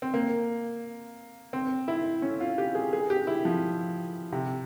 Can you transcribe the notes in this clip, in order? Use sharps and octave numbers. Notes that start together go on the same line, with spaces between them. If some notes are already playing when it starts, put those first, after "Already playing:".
C4
A#3
C4
E4
C#4
F4
G4
G#4
G#4
G4
E4
F3
C3